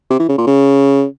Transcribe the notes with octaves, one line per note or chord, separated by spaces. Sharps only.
C3
E3
C#3
A#2
C#3